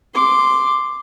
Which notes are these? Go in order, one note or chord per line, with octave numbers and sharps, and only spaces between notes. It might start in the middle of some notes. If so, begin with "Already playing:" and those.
C6 D6